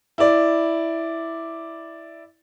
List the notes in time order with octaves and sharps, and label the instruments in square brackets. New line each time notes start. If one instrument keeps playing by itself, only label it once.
[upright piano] E4 D5